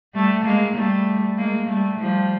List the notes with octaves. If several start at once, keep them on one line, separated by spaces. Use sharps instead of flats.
G3 A3
G#3 A#3
G3 A3
G#3 A#3
G3 A3
F3 G3